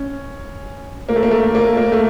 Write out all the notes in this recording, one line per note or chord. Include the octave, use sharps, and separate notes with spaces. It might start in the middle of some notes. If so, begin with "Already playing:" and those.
Already playing: C#4
A#3
A3
A#3
A3
A#3
A#3
A3